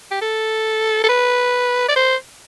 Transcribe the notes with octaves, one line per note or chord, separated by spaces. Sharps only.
G4
A4
A4
B4
D5
C5